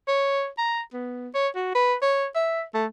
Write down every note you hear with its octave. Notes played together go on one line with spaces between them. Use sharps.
C#5
A#5
B3
C#5
F#4
B4
C#5
E5
A3